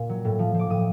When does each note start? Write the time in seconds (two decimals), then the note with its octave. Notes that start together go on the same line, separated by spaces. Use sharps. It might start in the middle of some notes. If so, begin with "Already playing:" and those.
Already playing: A#2
0.09 F#3
0.25 A2
0.39 F3
0.54 F3 D6
0.70 A2 D#6